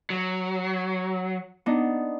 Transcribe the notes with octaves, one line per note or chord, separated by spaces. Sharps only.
F#3
B3 D4 D#4